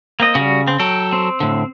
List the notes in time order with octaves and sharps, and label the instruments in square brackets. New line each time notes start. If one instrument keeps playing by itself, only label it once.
[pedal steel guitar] A#3 C4 D#5
[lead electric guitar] C#3 [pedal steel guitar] G3 F#4
[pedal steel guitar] C4
[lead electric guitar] F#3 A4 [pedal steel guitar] G5
[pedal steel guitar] C4
[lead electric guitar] A2 D3